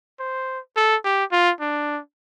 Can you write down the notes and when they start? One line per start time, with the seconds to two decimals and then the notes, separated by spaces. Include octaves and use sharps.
0.20 C5
0.76 A4
1.05 G4
1.32 F4
1.60 D4